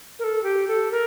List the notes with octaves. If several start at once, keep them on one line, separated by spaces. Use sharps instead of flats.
A#4
A4
G4
A4
A#4